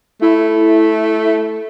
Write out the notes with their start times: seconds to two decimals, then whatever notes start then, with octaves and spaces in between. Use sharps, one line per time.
0.22 A3 E4